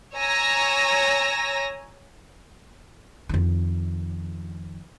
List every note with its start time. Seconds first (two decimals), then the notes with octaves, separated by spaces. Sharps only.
0.16 C#5 G#5 A#5 E6 A#6
3.29 F2 D#3